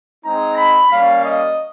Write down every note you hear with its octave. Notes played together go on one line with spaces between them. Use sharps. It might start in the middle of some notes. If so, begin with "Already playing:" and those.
G#3 C4 D#4 A#5
B5
G3 A#3 C#4 F5
D#5